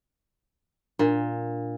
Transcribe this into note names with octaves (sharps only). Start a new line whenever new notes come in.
A#2 D4